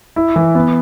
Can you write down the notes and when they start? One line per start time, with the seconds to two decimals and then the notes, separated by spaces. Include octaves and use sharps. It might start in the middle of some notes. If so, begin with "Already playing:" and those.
0.16 E4
0.36 E3
0.55 B3